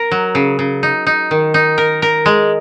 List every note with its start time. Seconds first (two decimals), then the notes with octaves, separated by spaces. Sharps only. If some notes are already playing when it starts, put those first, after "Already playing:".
Already playing: A#4
0.12 F#3
0.35 C#3
0.59 C#3
0.83 D#4
1.07 D#4
1.31 D#3
1.54 D#4
1.78 A#4
2.02 A#4
2.26 G#3